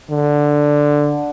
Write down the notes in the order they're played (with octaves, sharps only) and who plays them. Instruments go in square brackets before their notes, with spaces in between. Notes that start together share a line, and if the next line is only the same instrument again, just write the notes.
[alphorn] D3